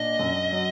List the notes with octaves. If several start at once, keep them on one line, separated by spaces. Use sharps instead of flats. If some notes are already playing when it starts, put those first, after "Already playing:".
Already playing: A#2 D4 D#5
F#2
F#3